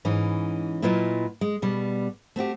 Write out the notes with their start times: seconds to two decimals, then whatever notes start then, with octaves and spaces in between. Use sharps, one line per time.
0.05 G#2 E3 C#4 D#4
0.82 A#2 F#3 E4 F4 B4 D#5
1.41 G#3
1.62 B2 G3
2.36 A3 C4 F#4 G4